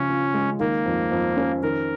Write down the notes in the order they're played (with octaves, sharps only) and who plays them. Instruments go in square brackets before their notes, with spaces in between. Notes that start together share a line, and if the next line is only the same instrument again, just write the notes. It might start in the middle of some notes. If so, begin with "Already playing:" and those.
Already playing: [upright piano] C#3 F3 [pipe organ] C#4
[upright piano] F4
G#3
[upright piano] D#3 [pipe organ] A#3
[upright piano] F2
F2
C#4
[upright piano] D#3 [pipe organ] A#4